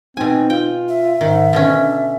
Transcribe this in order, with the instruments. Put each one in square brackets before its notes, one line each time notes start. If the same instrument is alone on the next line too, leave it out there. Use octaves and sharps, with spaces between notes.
[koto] B2 G#5 [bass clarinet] C4 [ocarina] D#4
[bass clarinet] F4 [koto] G5
[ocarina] E5
[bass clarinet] G#2 [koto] D#3
[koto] B2 D3 C#4
[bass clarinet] D4